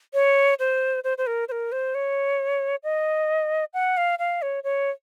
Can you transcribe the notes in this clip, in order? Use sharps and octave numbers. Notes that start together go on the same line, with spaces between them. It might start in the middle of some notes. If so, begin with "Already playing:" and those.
C#5
C5
C5
C5
A#4
C5
A#4
C5
C#5
D#5
F#5
F5
F5
C#5
C#5